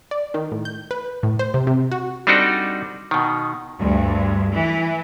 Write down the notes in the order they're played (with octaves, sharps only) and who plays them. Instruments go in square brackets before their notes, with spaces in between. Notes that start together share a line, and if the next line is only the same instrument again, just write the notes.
[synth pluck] D5
D#3
A2
G6
B4
A2
C5
C3
C3
F#4
[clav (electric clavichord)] G3 C4 D4 D#4 F#4 A4
B2 D#3
[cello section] D2 G2
E3